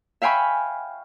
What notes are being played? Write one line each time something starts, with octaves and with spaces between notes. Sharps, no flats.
E5 F5 G5 G#5 B5 C#6